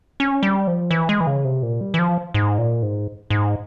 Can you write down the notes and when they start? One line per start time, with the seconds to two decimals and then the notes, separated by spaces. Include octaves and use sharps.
0.20 C#4
0.43 G3
0.67 F3
0.91 E3
1.09 G#3
1.20 E3
1.27 C#3
1.45 C3
1.63 A#2
1.81 G3
1.94 E3
1.99 F3
2.34 G#2
2.58 A#2
2.82 G#2
3.30 G#2